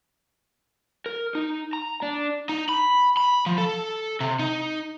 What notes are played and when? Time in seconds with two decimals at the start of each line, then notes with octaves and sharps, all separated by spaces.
1.06 A#4
1.35 D#4
1.73 A#5
2.02 D4
2.49 D#4
2.69 B5
3.17 B5
3.46 F3
3.58 A4
4.20 C3
4.39 D#4